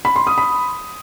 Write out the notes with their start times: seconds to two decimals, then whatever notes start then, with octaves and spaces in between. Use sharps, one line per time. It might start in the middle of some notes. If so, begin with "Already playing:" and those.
0.05 B5
0.16 C6
0.27 D#6
0.38 B5